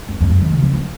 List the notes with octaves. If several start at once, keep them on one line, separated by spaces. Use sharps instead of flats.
F#2
F2
F#2
D#3
C#3
F3
F3